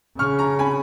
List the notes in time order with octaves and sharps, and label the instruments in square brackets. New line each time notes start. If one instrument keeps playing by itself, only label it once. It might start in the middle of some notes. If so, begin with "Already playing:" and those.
[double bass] C#3 [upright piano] C#6 F6
[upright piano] A#5 C#6
G#5 B5